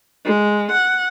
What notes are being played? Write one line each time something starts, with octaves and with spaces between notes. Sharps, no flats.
G#3
F#5